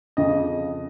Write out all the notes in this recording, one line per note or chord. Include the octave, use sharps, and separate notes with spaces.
F2 C#3 F3 D#5